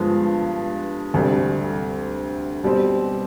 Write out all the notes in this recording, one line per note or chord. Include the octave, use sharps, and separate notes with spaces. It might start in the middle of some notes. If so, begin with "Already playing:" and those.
Already playing: G2 D3 F3 G#3 B3
D2 C3 G3
B2 G3 C4